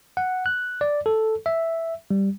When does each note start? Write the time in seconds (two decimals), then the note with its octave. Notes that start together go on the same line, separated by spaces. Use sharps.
0.17 F#5
0.46 F#6
0.81 D5
1.06 A4
1.46 E5
2.11 G3